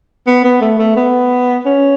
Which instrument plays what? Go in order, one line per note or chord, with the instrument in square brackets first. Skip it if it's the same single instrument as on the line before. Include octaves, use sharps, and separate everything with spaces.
[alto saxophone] B3
B3
A3
A3
B3
C#4